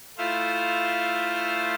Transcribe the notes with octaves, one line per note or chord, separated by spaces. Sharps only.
A3 E4 F4 C5 F5